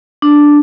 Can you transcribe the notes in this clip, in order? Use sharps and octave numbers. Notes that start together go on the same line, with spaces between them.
D4